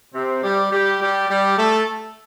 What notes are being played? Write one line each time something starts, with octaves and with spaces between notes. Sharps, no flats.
C3 C4
G3 G4
G3 G4
G3 G4
G3 G4
A3 A4